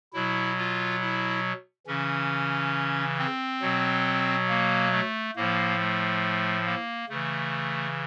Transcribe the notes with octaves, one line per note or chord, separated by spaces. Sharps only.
B2 F#3 E4
F4
E4
C#3 E3 C#4
C4
B2 F#3
A#3
A3
A2 F3 A#3
A3
A#3
C#3 A3
E3